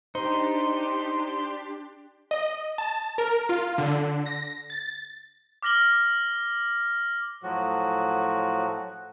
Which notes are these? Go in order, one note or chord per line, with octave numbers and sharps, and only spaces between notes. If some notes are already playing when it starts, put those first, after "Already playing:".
D4 D#4 G4 C5 C6
D#5
A5
A#4
F4
D3
A#6
A6
D6 F6 A#6 F#7 G7
A2 F3 F#3 F#4